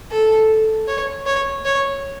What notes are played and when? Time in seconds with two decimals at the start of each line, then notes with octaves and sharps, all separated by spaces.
0.11 A4
0.88 C#5
1.26 C#5
1.65 C#5